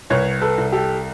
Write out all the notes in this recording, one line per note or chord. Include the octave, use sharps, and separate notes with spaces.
C2 B4 C#5
A4 B4
C2
G4 A4